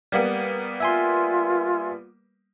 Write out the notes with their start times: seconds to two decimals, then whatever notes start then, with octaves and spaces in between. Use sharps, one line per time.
0.12 G3 A#3 B3
0.80 F4 E5 G#5 C6